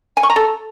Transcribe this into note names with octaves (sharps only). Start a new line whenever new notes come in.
G#5
C#6
A#5
A4